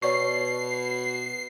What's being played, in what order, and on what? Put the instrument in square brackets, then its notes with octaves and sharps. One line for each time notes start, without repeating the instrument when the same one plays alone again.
[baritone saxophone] B2 [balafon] C#5 D5 C#6 [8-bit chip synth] C7